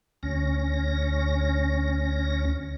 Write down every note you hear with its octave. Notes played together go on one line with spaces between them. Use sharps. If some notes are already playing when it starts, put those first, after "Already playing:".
D2 C#4 A#6